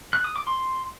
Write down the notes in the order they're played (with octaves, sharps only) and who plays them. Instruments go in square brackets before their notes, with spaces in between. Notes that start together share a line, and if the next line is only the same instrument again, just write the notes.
[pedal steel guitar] F#6
D#6
D6
C6